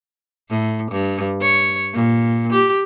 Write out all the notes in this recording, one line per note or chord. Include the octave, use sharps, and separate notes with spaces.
A2
G2
C#5
A#2
G4